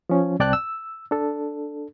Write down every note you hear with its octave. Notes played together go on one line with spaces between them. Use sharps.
F3 C#4
C2 C4 D5 G5 A5 F#6
E6
D4 A4